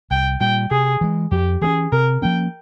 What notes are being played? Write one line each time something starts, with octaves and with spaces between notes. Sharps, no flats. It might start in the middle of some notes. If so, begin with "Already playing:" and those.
C2 G5
A#2 G3 G5
C3 G#4
E3 G#3
F2 G4
E3 A#3 C#4 G#4
C3 A#4
F3 A#3 C#4 G5